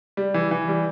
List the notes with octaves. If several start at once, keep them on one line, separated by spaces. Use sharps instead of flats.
G3
E3
E3
G3